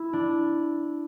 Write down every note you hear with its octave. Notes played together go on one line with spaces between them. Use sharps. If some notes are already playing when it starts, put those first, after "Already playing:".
Already playing: E4
D4